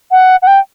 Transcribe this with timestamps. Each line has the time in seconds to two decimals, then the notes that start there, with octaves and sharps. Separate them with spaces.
0.11 F#5
0.42 F#5
0.47 G5